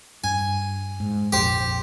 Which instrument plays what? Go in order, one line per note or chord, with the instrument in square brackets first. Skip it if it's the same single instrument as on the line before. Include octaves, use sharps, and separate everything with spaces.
[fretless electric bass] G2 [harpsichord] G#5
[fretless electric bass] G#2
[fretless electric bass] A#1 F2 [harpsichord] G4 C5